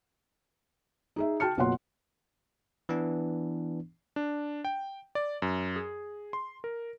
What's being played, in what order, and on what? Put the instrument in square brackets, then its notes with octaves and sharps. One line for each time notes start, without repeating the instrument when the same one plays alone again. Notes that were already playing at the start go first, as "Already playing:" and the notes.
[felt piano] D#4 G#4 E5
F#4 G5 A5 F6 C#7
F#1 B2 F4 C#5 F#5 C6
[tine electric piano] E3 B3 D4
[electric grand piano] D4
G5
D5
F#2
G#4
C6
A#4